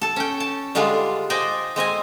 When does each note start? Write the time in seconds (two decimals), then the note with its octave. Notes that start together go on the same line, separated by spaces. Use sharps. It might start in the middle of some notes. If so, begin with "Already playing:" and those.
0.02 A4 A5
0.16 C#4 G5
0.40 A5
0.75 D3 G3 G#3 D4 F4
1.30 C5 D5 D#5 G5 G#5
1.76 G#3 C4 D#5 G#5